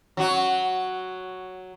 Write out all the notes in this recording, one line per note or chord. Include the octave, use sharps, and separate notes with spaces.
F#3 F#4